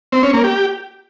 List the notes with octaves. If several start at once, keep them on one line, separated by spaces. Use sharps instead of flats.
C4
C#4
A#3
G4